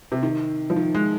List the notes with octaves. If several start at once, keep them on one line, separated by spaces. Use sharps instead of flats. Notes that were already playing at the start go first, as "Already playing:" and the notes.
C3
D#3
F3
D#3
G#3